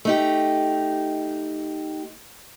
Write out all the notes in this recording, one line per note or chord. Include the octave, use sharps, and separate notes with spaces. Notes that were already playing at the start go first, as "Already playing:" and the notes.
A3 D#4 G4